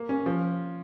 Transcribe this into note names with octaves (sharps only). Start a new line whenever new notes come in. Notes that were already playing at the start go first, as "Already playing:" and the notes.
Already playing: A#3
C#4
F3